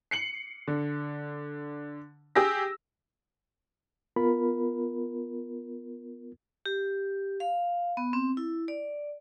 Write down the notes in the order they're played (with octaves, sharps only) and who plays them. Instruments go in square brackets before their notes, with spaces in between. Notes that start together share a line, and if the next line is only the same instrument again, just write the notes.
[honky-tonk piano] C7 C#7 F#7
D3
G4 G#4 E6 A#6
[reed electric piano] B3 F4 A#4 B5
[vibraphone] G4
F5
B3
C4
E4
D5